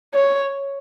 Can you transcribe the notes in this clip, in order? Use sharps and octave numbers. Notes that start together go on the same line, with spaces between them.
C#5